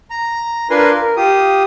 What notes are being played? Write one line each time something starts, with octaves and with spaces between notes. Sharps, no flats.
A#5
D4 F4 A#4 B4 G#5 C6
A#4
F4 G4 D#6